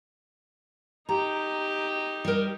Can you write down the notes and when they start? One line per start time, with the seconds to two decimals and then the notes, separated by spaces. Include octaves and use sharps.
1.09 D#4 G4 A#5
2.25 G3 A#4